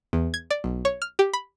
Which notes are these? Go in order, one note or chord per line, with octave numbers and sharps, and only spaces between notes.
E2
G#6
D5
B1
C#5
F6
G4
B5